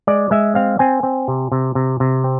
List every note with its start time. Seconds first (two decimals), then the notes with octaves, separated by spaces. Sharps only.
0.07 G#3 D5
0.31 G#3 E5
0.55 C4 F5
0.79 C4 G#5
1.03 C4
1.28 C3
1.52 C3
1.75 C3
2.00 C3
2.24 C4